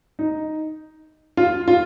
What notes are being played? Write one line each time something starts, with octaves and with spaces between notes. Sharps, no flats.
D#4
F4
F4